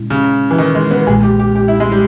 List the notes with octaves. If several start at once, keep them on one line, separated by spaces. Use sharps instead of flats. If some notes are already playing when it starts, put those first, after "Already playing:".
Already playing: A#2 G#3 C#4 E4
C#3
E3
D#3
G#3
B3
B1 A#2 G#3 G#4
G4
G4
G4
E4
G#3
G3